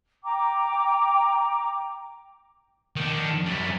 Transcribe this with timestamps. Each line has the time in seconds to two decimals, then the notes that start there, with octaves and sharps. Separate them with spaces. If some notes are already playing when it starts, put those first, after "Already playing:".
0.23 G5 A#5 D6
2.96 D#3 D4
3.46 F#2 G3